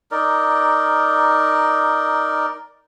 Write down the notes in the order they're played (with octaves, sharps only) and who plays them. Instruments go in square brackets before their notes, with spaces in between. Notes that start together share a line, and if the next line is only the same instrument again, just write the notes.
[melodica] D#4 A#4 D5